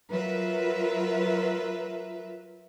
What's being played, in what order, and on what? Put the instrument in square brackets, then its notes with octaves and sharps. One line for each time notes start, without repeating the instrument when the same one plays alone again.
[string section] F#3 F4 A#4 B4 E5